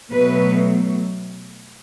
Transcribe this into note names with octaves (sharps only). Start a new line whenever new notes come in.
B2 F#3 A3 B4